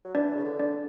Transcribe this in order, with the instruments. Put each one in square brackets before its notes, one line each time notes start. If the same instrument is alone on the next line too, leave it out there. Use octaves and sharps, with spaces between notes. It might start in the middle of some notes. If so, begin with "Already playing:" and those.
[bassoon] F#3
[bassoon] E3 [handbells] D4 D5
[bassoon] C#3
D3
[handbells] D4 D5